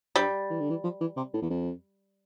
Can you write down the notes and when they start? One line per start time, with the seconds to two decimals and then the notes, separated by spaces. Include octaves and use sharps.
0.15 G2 G3
0.50 E3
0.60 D3
0.70 E3
0.84 F3
1.01 E3
1.17 C3
1.34 A2
1.42 E2
1.50 F2